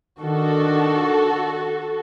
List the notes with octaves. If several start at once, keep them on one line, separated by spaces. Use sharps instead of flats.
D#3 D4 F#4 A4